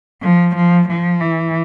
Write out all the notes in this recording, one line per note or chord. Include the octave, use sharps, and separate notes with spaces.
F3
F3
F3
E3